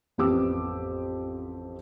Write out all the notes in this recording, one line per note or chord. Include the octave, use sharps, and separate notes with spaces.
A1 F2 B3 G4 D6 E6